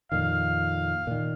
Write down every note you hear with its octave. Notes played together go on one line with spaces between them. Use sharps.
F2 A#2 D#3 F5
A#2 D#3